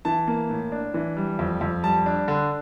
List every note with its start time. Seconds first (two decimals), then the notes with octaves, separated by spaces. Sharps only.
0.05 E3 A5
0.27 A#3
0.50 A2
0.72 D4
0.94 E3
1.17 G3
1.39 F2
1.61 F2
1.83 G3 A5
2.06 D4
2.28 D3